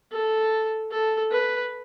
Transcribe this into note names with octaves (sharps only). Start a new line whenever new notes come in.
A4
A4
B4